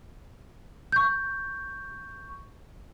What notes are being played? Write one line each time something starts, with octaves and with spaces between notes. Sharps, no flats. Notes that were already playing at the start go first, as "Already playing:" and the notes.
C#6 G6